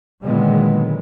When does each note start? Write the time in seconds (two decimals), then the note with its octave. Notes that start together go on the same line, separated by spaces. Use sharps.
0.23 A#2 D3 D#3 F#3 G#3 B3